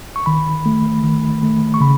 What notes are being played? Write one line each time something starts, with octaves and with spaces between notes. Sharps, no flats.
C#6
D#3 B5
A3
D#3
A3
C#6
C#3 B5